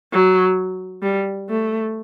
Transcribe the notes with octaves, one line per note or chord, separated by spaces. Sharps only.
F#3
G3
A3